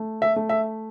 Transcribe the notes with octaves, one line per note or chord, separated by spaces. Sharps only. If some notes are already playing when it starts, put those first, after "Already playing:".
Already playing: A3
E5
A3
E5